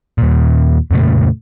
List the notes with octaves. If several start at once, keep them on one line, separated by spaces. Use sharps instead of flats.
D#2 A#2
F2 A#2 C#3 A3